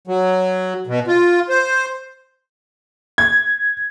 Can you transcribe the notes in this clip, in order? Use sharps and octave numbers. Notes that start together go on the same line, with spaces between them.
F#3
B2
F4
C5
G#6